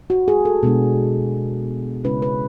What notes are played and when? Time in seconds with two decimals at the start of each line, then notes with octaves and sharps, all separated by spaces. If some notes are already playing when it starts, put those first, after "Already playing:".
0.10 F#4
0.28 G#4
0.45 A4
0.63 B2 G#3 B3 D4
2.04 C#3 G#3 C#4 E4 B4
2.22 B4